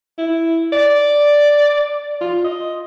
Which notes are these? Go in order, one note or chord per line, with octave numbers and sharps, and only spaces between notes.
E4
D5
F4
D#5